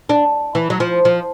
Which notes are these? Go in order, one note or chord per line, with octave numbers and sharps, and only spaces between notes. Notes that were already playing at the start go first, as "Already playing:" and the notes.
D4
E3
F#3
F3
F3